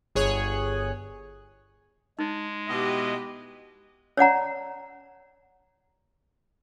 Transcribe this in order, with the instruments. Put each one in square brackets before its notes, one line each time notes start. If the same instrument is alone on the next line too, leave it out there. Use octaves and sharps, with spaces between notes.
[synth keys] G1 G#4 C#5 F#6
[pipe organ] G#3 [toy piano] D#4
[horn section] B2 E4 D#5 [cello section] G4
[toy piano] C#5 D5 F#5 A#5